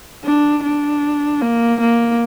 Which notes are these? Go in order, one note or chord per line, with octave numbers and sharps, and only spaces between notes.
D4
D4
A#3
A#3